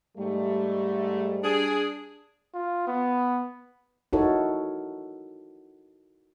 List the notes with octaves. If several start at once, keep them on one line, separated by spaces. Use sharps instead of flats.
G#2 G3 A3
D4 G#4
F4
B3
D#4 E4 F#4 A4 A#4 C#5